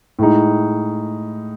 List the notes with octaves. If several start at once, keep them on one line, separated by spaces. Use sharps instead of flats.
A2 G#3 D#4